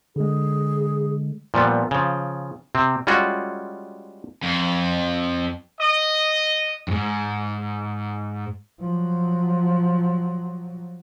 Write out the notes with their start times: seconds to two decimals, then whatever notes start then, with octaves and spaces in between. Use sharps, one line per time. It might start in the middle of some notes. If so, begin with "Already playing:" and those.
0.16 D3 G#3 G#4
1.54 A#2 F3 G3 B3
1.91 C#3 F3
2.75 C3 C4
3.07 G3 G#3 C#4 F4 F#4
4.43 F2
5.80 D#5
6.88 F2 G#2
8.81 F3 F#3